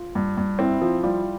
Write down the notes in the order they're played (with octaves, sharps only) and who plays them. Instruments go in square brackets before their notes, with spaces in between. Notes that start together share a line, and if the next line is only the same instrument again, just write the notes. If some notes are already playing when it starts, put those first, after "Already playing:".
Already playing: [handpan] F4
[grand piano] G2
G2
[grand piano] C4 [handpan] E4
[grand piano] F3
[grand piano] G3 [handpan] F4